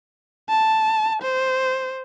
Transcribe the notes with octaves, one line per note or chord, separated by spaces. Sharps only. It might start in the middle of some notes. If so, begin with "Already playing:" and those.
A5
C5